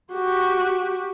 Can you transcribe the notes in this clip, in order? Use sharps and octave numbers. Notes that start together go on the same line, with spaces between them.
F#4 G4